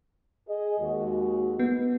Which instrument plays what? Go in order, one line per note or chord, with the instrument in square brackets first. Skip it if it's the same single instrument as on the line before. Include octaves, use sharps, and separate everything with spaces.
[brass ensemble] G#4 D#5
D#2 G#3 F#4
[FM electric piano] B3